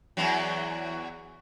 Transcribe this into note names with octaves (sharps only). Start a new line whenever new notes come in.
E2 E3 F#3